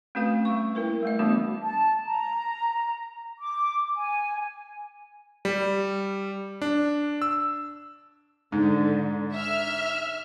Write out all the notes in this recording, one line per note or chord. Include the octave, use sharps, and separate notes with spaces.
A3 C4 C#4 F#4 B4 F5
G3 C#6
A#3 E4 A#4 B4
G3 A3 D#5
E3 G3 A3 B3 D4 F#4
A5
A#5
D6
G#5
G3
D4
E6
G#2 D3
E5 F6